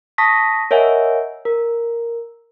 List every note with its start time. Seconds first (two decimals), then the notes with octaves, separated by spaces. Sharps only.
0.18 A5 C#6 D#6 A#6 B6
0.71 A#4 C#5 D#5 E5 F#5 G#5
1.45 A#4